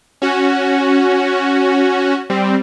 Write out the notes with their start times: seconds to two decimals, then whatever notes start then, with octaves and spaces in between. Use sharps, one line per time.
0.22 C#4 F#4
2.30 G3 C4